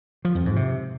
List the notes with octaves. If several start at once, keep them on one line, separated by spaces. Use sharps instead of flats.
F3
F2
G#2
C3